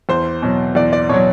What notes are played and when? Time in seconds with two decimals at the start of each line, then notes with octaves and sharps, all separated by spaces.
0.09 E2 C5
0.42 B2 F#3
0.75 E2 D5
0.93 D5
1.09 B2 C#5
1.14 F#3